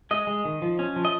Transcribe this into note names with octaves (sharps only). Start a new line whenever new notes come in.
G#3 D#5
G#3
D#3
F3
C#4
F3
D#5